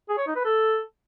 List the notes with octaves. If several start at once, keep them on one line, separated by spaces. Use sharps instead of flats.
G#4
C#5
D#4
B4
A4